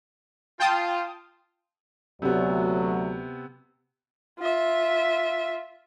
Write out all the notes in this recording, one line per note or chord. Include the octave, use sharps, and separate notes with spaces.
F4 G5 A5 D#6
D2 C3 F#3 B3
F4 E5